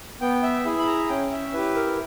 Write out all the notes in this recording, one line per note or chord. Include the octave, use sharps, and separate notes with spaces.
B3 G5
E5
E4 G#4
B5
A#5
C#4 G5
E5
E4 G4 B4
A#4